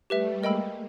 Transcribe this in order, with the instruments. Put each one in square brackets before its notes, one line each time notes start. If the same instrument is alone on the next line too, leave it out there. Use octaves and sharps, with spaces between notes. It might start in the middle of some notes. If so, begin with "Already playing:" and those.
[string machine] G3 A3 [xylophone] G4 B4 E5
[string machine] G#3 A#3 [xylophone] A#4 D#5 G5 B5 E6